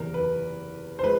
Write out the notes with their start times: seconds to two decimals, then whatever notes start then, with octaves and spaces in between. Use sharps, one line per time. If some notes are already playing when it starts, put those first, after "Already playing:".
Already playing: F#1 E2 C3 E3 A#4
0.14 B4
0.99 C5
1.03 F3 G#3 B4